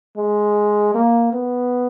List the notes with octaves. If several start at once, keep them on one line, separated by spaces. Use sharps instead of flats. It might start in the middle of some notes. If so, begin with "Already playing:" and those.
G#3
A#3
B3